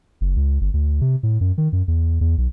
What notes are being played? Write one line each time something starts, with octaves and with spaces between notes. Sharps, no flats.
F#1
C#2
G1
D2
C3
A2
F#2
D#3
F#2
E2
E2
B1